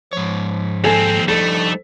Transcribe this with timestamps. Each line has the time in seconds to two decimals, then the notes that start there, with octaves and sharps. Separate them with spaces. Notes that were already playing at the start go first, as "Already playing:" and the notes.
0.13 G#2 F3 C#5
0.84 D#2 C4 A4 G#5
1.28 G3 A3 D4 D#4 A4